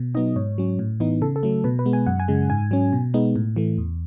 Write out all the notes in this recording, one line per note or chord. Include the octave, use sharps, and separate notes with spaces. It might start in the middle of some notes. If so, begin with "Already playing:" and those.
Already playing: B2
F#3 B3 D#4 D#5
G#2 C#5
F#3 C#4
A2
E3 B3 D#4
C#3 A4
A4
F#3 A3
B2 B4
B4
G#3 B3
G#5
F#2 F#5
G#5
C#3 G#3
G#2 G#5
F#3 C#4
B2
G#3 B3 D#4
A2
E3 A3
E2